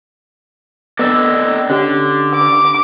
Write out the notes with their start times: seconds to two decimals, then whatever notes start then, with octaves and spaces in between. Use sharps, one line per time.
0.99 B3 A4 D5 D#5 E6 A6
1.70 D3 C#4 G4
2.36 D6